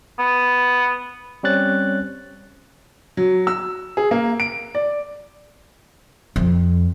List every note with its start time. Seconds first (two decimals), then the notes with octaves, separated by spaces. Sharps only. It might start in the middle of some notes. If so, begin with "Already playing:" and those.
0.19 B3
1.43 G3 C4 C#4 C#5 F#6 A6
3.17 F#3
3.47 E6
3.97 G#4
4.11 A#3
4.40 D7
4.75 D5
6.36 F2